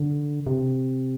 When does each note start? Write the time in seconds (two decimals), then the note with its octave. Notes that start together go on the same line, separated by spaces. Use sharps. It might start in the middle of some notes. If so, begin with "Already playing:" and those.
Already playing: D3
0.47 C3